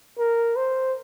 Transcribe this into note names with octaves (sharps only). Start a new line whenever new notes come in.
A#4
C5